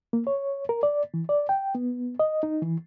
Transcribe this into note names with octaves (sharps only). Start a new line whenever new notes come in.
A#3
C#5
A#4
D5
E3
D5
G5
B3
D#5
D#4
E3